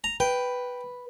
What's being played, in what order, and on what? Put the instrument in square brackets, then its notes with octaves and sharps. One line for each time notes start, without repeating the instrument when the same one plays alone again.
[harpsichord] A#5
[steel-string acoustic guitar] B4 [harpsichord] G5